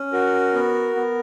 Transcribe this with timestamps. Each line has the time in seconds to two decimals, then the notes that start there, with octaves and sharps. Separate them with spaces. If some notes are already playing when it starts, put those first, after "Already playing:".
Already playing: C#4
0.13 F#4 A#4
0.54 B3
0.95 B3